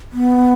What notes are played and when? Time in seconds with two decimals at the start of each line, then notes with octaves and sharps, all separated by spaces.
0.13 B3